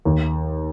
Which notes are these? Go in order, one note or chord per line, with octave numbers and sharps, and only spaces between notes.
D#2